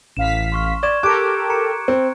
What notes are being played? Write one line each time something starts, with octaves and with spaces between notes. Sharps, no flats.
A1 F5 B6 E7
C6 C#6 F6
D5 C#6 G#6 E7
G4 A4 A#4 D6 F#6 G6 D7
A#5 C#7
C4